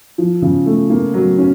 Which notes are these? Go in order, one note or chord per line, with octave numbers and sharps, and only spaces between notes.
F3
C#3
A3
A#3
F#3
C#4